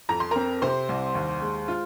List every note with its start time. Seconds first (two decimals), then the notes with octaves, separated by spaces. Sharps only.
0.09 F2 A#5
0.20 C6
0.31 C4 A#4 A#5
0.62 C3 C5 C6
0.89 C2
1.15 D#2
1.42 G#3
1.68 F4